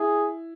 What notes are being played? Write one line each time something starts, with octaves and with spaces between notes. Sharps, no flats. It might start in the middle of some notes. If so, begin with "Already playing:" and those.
Already playing: E4 G#4